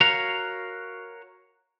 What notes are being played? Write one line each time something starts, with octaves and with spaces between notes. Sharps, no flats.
F#4 A#4 C#5 F5